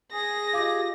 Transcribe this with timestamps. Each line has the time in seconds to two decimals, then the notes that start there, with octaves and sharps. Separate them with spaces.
0.12 G#4 A#6
0.53 F4 G4 D#5 F5 D6